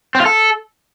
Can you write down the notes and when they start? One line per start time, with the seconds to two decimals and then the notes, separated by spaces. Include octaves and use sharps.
0.15 C4
0.20 F4
0.26 A4